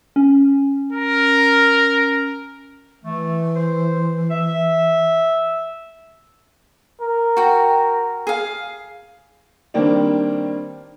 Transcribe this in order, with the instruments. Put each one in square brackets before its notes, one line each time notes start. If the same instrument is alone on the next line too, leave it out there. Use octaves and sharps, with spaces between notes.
[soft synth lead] C#4
[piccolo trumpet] A#4
[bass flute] E3 [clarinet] A3
[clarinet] C5
E5
[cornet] A#4
[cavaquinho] F#4 G5
G#4 F5
[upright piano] D#3 G3 A#3 C4 D4